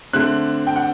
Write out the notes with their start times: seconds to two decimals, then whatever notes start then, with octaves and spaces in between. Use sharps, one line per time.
0.13 D3 A3 C4 F#6
0.67 G5
0.76 F#5